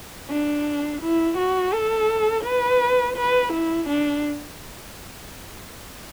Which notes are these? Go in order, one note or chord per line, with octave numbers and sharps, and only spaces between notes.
D4
E4
F#4
A4
B4
B4
E4
D4